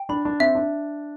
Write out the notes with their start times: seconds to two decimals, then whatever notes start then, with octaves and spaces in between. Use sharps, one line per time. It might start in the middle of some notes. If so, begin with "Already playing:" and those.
Already playing: G5
0.09 D4 B5
0.25 D4
0.40 C4 E5
0.55 D4